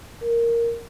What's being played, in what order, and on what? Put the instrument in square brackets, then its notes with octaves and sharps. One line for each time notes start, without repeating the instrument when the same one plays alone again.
[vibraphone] A#4